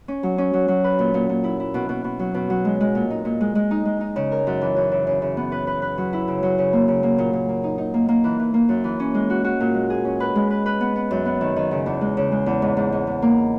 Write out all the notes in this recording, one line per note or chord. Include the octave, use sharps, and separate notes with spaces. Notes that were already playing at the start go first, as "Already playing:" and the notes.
C#4
F#3
C#4
F#3
F#3
B4
A#2
A#2
A#2
E4
E4
B2
B2
B2
F#3
B2
F#3
G#3
G#3
A#2
D#4
A#2
G#3
G#3
D#4
G#3
D#4
C#3
A#4
F#2
E3
F#2
C#3
C#3
C#3
B3
B4
B4
B4
F#3
E4
C#3
F#3
C#3
A#3
C#3
A#3
A#2
A#2
A#3
D#4
D#4
A#3
A#3
E3
E3
A#3
F#2
E3
C#4
G#3
F#4
F#4
A#2
G#3
G#4
C#4
B4
G#3
B4
B4
B3
B3
F#2
B3
D#3
D#3
C#3
E2
G#3
C#3
G#3
E2
G#2
G#2
G#2
G#2
A#3